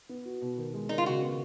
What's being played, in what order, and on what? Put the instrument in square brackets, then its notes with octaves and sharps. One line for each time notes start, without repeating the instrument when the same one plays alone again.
[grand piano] B3
F#4
B2
D#3
G#3
[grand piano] D#3 [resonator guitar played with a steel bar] D#4
[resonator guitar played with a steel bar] F4
[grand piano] C#3 [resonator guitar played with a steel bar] F#4
[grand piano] B3